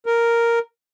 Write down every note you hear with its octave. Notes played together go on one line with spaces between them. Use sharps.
A#4